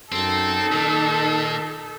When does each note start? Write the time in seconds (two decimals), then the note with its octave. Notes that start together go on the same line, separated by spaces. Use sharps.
0.12 F#2 C4 D#4 A4
0.72 A#2 D#3